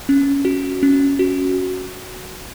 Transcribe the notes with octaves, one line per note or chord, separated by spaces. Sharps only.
C#4
F#4
C#4
F#4